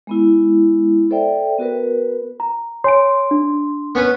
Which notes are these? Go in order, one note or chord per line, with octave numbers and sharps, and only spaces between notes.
G#3 B3 E4
A4 C5 D5 E5 G5
B3 F#4 A#4 B4
A#5
C#5 G#5 C6 D7
D4
B3 C#4 B4